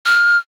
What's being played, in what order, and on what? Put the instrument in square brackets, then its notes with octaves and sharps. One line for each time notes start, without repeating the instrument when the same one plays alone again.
[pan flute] F6